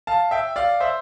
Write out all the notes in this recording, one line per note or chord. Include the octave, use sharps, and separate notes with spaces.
F5 A5
E5 G5
D5 F5
C5 E5